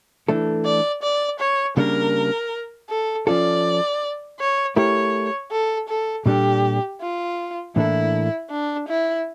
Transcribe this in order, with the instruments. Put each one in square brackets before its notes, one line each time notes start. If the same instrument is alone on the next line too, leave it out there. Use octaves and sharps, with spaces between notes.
[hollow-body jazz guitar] E3 A3 D4 A4
[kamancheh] D5
D5
C#5
[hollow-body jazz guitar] C#3 G3 A#3 D4 [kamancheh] A#4
[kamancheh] A4
[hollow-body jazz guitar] F3 C#4 F4 A4 [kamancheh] D5
[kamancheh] C#5
[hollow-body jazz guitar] A3 E4 G4 A#4 [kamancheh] C#5
[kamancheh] A4
A4
[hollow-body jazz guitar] A#2 G3 D4 A4 [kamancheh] G4
[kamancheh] F4
[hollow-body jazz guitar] A2 E3 A#3 D4 A4 [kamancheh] E4
[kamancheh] D4
E4